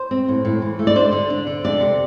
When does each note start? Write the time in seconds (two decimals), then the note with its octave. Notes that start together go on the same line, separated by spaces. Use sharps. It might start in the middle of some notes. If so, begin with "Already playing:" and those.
Already playing: C5
0.11 C4
0.28 A2
0.45 A2
0.62 E3
0.79 A3
0.87 D5
0.96 D4 C5
1.13 D3
1.30 D4
1.47 D3
1.64 F2 D5
1.81 C3